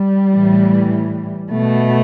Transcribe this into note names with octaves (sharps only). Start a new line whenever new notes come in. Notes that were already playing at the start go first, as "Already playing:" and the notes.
Already playing: G3
A2 E3
B2 A3